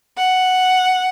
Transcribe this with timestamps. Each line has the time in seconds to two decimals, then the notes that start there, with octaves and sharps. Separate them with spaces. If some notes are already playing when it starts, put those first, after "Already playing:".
0.17 F#5